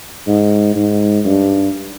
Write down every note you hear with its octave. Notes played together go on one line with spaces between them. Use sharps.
G#2
G#2
G2